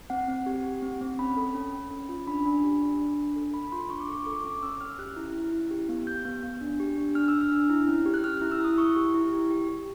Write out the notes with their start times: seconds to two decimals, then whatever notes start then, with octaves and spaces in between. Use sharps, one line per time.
0.10 C4 F#5
0.28 C4
0.46 G4
0.64 G4
0.82 C4
1.01 C4
1.19 C#4 B5
1.37 A4
1.55 C#4
1.73 C#4
1.91 C#4
2.09 F4
2.27 D4 B5
2.46 D4
2.64 G4
2.82 D4
3.00 D4
3.18 D4
3.36 A4
3.54 A4 B5
3.68 B5
3.72 F4 C6
3.90 D4 C#6
4.00 D6
4.08 A4 C#6
4.23 A4 D6
4.32 C#6
4.44 C#4 D6
4.63 C#4 E6
4.81 C#4 F6
4.99 G4 F#6
5.16 E4
5.35 C#4
5.53 E4
5.71 G4
5.89 B3
6.07 G4 G6
6.25 B3
6.43 B3
6.61 D4
6.80 G4
6.98 D4
7.15 D4 F6
7.28 E6
7.34 D4
7.41 F6
7.52 D4
7.70 E4
7.88 C#4
8.06 G4
8.14 F#6
8.24 G4 F6
8.38 E4 F#6
8.52 E6
8.60 E4 D#6
8.78 E4 C#6
8.96 G4
9.14 E4
9.33 G4
9.51 G4
9.69 G4